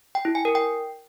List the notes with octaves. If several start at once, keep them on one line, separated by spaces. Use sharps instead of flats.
G5
E4
G#5
A#4
G5